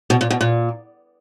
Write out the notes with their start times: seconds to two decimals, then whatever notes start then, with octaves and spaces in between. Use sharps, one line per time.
0.10 B2
0.21 A#2
0.30 B2
0.41 A#2